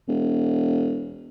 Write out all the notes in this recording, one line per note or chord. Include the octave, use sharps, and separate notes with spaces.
E1